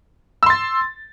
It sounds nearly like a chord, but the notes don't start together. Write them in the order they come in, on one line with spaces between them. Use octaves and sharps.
E6 C6 A6